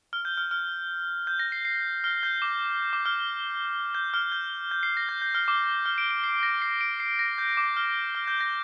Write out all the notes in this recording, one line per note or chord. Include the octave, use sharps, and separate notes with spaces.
F6
G6
F6
F6
G6
A#6
C7
C7
F6
G6
D6
D6
F6
G6
F6
G6
G6
C7
A#6
G6
G6
F6
D6
F6
D7
D7
C7
A#6
C7
D7
C7
A#6
G6
D6
F6
F6
G6
A#6